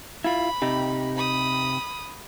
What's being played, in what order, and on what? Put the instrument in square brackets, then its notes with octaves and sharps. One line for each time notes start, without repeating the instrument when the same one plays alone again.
[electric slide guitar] E4 F4 [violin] B5
[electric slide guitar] C3 D#4 G4
[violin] B5 D#6